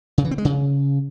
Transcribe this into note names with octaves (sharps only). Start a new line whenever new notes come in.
C#3
E3
C4
G#3
C#3